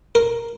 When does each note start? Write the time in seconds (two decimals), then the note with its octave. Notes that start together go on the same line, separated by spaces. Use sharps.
0.15 A#4